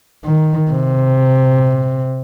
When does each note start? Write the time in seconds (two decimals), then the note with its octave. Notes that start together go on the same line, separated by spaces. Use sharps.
0.25 D#3
0.71 C3